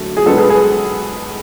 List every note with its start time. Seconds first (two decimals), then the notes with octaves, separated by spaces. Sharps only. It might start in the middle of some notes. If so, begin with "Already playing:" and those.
Already playing: F#2 D3 F#3 A3
0.17 G#4
0.26 B1 B2 G#3 B3 D4 A4
0.38 G#4 B4
0.49 G#4 B4